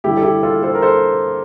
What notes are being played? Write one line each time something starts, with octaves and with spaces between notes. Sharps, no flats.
G2 D3 A3 E4 G4
A4
E4 G4
F4 A4
A4 C5
A#4
A4 C5